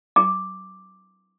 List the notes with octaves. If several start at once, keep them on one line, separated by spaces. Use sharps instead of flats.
D6